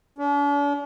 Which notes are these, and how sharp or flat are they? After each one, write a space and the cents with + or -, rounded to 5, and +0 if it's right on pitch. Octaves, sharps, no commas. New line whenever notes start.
D4 -45